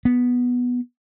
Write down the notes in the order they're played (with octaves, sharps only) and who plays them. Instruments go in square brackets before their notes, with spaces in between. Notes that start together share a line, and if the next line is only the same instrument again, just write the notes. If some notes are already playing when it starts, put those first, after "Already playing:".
[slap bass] B3